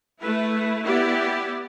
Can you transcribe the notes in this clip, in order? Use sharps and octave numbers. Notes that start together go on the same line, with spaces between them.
A3 E4 B4
B3 E4 G4 D5